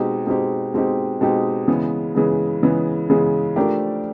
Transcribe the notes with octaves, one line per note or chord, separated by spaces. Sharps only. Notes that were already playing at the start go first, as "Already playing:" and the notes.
Already playing: B2 G#3 C4 D#4 G4
B2 G#3 C4 D#4 G4
B2 G#3 C4 D#4 G4
B2 G#3 C4 D#4 G4
C#3 E3 G#3 B3
C#3 E3 G#3 B3
C#3 E3 G#3 B3
C#3 E3 G#3 B3
F3 A3 D4 G4 A#4